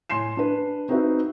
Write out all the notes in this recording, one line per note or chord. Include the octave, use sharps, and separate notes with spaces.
A2 G#5 C6 C7 E7
D4 B4
C4 D#4 F#4 B4 E5